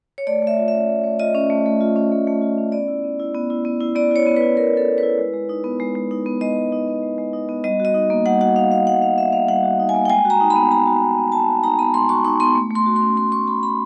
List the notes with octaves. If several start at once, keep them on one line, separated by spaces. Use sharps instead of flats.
C#5
A3 D5
A3 E5
F4
E5
C#4
A3
A3
F4 D#5
C#4
A3
A3
F4
C#4
A3
A3
F4
C#4
B3 D5
E4
B3
E4
B3
E4
B3
E4
B3 D5
E4 C#5
B3
B4
E4
B3 A#4
E4 A4
B3
B4
E4
G#3
G#3
D#4
B3
G#3
G#3
D#4
B3
G#3 D#5
G#3
D#4
B3
G#3
G#3
D#4
B3
G3 D#5
F#4
D#5
D#4
A#3
G3 F#5
F#4 F#5
D#4 F5
A#3 F5
G3 F#5
F#4 F5
D#4 E5
A#3 F5
G3 F#5
F#4
D#4
G#5
A#3
G5
G#3 G#5
F#4
A#5
D#4
B5
B3
G#3 A#5
F#4
D#4
B3
G#3 A5
F#4
D#4 A#5
B3 B5
G#3 C6
F#4 C#6
D#4 C#6
B3 C6
A3
A3 C6
F#4
C6
C#4
A3 C6
A3 C#6
F#4 B5
C#4 B5